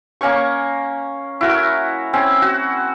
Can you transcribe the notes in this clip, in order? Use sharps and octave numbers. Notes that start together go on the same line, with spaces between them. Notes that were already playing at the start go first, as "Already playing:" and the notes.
A#3 C#4 C#5 C#6
E4 F#4 A#4
C4 C#4
F#4